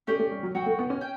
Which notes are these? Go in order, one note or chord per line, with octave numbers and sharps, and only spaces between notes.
A3 C#4 G4 D5
A3
G3
F#3
F#3 F#4 C#5 G5
A3
B3
C#4
G5